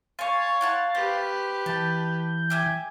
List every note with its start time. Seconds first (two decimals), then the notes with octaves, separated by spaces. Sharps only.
0.19 C#5 F5 G#5 C6 C#6 A6
0.61 E4 F#5 A5
0.95 G4 B4 C5
1.66 E3 A5 G6
2.50 G4 E5 G#5